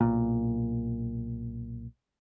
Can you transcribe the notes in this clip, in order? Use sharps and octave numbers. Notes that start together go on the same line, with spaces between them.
B1 A#2